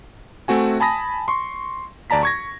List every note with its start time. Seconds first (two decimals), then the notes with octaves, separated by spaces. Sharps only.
0.48 A3 C4 F#4 G#5
0.80 G#5 A5 B5 D#6 A#6
1.28 C6 C#6
2.10 D2 D5 A5 A#5 B6
2.23 C#6 G#6 A#6